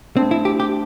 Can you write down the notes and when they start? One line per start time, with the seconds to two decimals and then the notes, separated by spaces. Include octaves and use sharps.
0.17 A3 C4 D4 C5 A5
0.31 E4
0.45 G4
0.60 G4